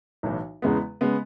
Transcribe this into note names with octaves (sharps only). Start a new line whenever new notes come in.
B1 A2 E3
E2 C#3 G#3 B3
C#3 G#3 B3